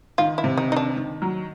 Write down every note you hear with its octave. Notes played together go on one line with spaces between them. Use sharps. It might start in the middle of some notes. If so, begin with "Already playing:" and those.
D#3 F4
E4
C3
D#4
D#3 D#4
D4
D#3
F#3